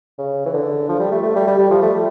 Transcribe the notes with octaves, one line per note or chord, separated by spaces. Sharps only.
C#3
E3
D3
F3
G3
A3
A3
G3
G3
G3
F3
A3
G3